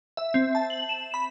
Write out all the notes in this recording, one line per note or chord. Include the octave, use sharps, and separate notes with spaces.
E5
C4
A5
F#7
E7
B5